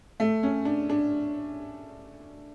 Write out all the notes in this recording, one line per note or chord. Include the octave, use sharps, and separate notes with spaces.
A3
C#4
D4
D4